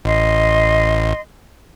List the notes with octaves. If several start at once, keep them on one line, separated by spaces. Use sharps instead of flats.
A1 D#5 C6